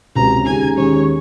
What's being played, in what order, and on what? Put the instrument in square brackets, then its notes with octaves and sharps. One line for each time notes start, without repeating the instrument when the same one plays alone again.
[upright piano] C#2 C3 F#3 C#4 [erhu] A#5
[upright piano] D#2 D#3 G#3 C#4 [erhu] G#5
[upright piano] D#2 D#3 G#3 C#4 [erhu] C#5